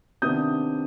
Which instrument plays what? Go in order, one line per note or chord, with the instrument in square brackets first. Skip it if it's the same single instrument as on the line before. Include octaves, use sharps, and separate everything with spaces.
[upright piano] C3 D#3 B3 D4 D#6 G6